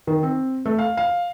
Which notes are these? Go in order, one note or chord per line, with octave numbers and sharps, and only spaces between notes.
D#3
C4
A3
F5
F5